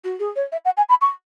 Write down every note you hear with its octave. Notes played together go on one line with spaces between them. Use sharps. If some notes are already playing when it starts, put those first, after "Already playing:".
F#4
G#4
C#5
E5
F#5
G#5
B5
C#6